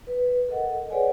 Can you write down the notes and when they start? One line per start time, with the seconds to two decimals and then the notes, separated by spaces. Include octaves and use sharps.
0.07 B4
0.49 A4 A#4 D#5 F#5
0.90 G#4 B4 C#5 D5 F#5 G#5